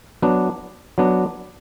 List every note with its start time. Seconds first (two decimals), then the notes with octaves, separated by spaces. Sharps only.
0.22 F#3 B3 D4
0.98 F#3 B3 D4